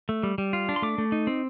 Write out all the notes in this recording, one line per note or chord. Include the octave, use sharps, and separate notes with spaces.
A3
G3
G3
F4
D4
C6
A3 D6
A3
D#4
C4